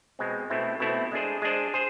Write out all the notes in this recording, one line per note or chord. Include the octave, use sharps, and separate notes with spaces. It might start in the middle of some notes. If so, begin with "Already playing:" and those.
B2 G#3 C4
B2 A3 C4 E4
B2 A3 C4 E4
G#3 D4 G#4 C5
G#3 D4 G#4 C5
G#4 C5